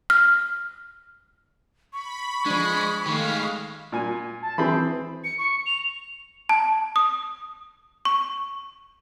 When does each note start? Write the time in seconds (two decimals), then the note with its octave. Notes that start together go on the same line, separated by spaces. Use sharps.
0.10 F6
1.93 B5 C#6
2.46 F3 G#3 D4
3.06 D#3 G#3 A3 G4 F5
3.92 A#2 G#5
4.42 A5
4.58 E3 C4 G#4 B5
5.24 C#7
5.38 C#6
5.66 F7
6.49 A5
6.96 D#6
8.05 C#6